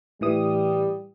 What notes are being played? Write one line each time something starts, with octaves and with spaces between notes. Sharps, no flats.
A2 E3 G3 D#6